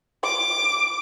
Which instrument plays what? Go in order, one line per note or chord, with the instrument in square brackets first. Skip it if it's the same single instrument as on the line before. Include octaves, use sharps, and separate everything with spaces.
[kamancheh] D6